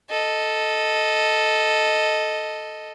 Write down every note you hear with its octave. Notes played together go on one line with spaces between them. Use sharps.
A4 D#5